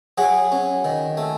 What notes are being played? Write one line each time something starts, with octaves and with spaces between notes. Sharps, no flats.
F#3 F#4 G#4
C#4
D#3
A3